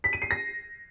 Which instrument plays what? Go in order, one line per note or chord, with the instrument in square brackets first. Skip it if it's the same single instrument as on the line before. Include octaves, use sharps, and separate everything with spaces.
[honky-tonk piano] B6
D#7
C7
A#6